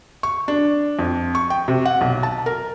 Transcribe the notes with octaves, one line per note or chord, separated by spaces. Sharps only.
C#6
D4
F2
C#6
G5
C3
F#5
B1
A5
A#4